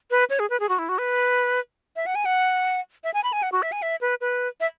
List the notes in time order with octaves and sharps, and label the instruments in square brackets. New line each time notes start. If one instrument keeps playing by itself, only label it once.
[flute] B4
C#5
G#4
B4
G#4
F#4
E4
F#4
B4
E5
F#5
G#5
F#5
E5
G#5
B5
G#5
F#5
F#4
E5
G#5
E5
B4
B4
E5